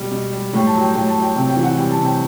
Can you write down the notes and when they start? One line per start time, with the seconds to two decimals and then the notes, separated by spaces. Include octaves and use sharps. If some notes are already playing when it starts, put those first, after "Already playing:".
Already playing: B2 G3
0.11 B2
0.33 G3
0.53 A2 G5
0.67 A5
0.74 F#3
0.81 G5
0.95 A2 G5
1.09 A5
1.16 F#3
1.22 G5
1.36 C3 G5
1.50 G5
1.57 E3
1.64 F#5
1.78 G3 G5
1.91 A5
1.98 C3
2.05 G5